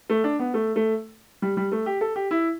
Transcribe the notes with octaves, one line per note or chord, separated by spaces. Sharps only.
A3
D4
B3
A3
A3
G3
G3
A3
G4
A4
G4
E4